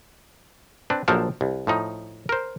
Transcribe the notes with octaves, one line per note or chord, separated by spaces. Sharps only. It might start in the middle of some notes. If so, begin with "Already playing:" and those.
C4 D4 B4
A#1 F3 F#3 A4 A#4 C5
C2
A2 F3 D#4
A#4 C5